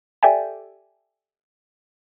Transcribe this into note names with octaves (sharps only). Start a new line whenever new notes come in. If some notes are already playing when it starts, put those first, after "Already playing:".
G4 A4 D5 E5 G5 G#5